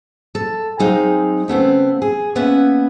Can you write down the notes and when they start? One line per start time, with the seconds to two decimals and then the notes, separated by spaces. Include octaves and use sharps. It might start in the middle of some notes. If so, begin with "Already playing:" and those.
0.35 A4
0.80 F#3 G#3 C4 D#4 F5
1.48 C#3 A3 B3 C4
2.02 G#4
2.35 A#3 B3 C#4 B4 E5 F#5